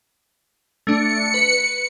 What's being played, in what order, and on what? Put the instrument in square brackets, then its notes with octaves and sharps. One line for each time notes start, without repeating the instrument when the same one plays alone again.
[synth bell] A3 D4 [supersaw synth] C#7
[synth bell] B4